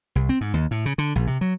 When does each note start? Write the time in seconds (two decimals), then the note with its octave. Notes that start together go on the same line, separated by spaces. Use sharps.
0.15 C2
0.29 C4
0.41 G#2
0.54 D#2
0.71 A2
0.86 C#3
0.98 D3
1.15 A#1
1.27 C3
1.41 F#3